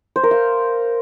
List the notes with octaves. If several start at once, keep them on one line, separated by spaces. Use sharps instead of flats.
C5
A#4
F5